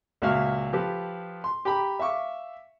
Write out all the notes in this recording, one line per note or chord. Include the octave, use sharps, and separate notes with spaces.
C#2 A#2 F#4 E5 F5 F6
F3 G4 A4 B4
C6
G4 G5 A#5 B5 D6
E5 F5 C#6 D6